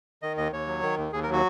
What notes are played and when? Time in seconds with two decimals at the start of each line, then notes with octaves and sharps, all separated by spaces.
0.22 D#3 D#5
0.37 D#2 D#5
0.52 D#2 C#5
0.67 F#3
0.82 D#3
0.98 D#2
1.13 D#2 G#4
1.23 A#4
1.27 F#3
1.33 F#4